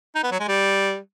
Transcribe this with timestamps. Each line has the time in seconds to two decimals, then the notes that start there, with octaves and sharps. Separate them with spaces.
0.15 D#4
0.23 B3
0.31 F#3
0.40 G#3
0.48 G3